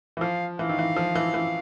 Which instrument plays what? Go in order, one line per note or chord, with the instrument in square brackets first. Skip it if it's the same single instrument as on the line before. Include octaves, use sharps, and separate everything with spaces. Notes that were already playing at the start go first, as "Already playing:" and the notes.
[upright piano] E3
[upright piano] F3 [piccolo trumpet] F5
[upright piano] E3 [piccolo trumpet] F5
[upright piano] D#3
E3
F3
E3
E3